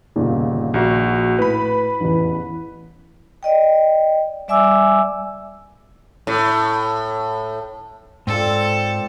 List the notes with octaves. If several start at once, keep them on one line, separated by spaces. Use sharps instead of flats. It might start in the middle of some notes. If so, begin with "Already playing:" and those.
G1 D#2 A#2 C#3
A#1 F#4
A2 B4 B5
A1 E2
D5 D#5 G5
G3 D5 E5 G#5 D6 E6
A2
G#2 C4 D4 F4 A4